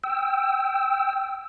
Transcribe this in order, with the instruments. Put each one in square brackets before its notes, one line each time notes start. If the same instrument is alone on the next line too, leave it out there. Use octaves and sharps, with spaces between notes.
[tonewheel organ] G5 E6